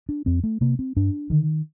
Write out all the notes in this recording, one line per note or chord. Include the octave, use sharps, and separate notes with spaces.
D4
F2 C4
A3
C3 A#3
C4
G2 D4
D3 D#3